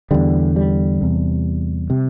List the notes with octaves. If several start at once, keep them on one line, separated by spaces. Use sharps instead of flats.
E2 D3 G3
G3
E2 C3
C3